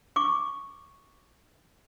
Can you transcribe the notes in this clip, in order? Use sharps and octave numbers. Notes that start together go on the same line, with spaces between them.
C#6 D6